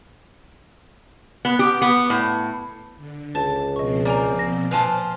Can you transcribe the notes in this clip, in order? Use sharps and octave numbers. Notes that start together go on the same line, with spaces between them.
B3
G4
B3
A2
D3
C#2 A5
B2 F3 C4 D#5 C#6
A#3 D5 G#5 A#5
A#6
A#2 F3 B4 C5 F5 G#5 A5